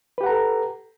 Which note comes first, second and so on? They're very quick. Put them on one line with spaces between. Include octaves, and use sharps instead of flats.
B4 G4 F#5 A#5 A4